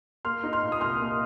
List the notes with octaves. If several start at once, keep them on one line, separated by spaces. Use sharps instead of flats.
A#3 C6 F6
D#4
C6 F6
A#2
D#6
C2 C6 F6
A#3